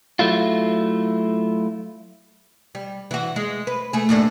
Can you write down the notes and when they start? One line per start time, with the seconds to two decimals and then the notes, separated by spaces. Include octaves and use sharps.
0.19 F#3 A3 E4 F4
2.75 G3
3.11 E3 F#4
3.36 G#3
3.67 B4
3.93 A3 G#4
4.09 D#2 A2 D4